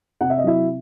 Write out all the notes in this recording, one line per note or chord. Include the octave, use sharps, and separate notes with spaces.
C3 F#5
E5
D#5
F#3 E4 E5